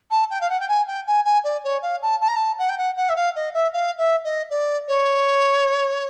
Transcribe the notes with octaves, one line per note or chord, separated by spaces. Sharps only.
A5
G5
F5
F#5
G5
G#5
G5
G#5
G#5
D5
C#5
F5
A5
A5
A#5
A5
F#5
G5
F#5
F#5
E5
F5
D#5
E5
F5
E5
D#5
D5
C#5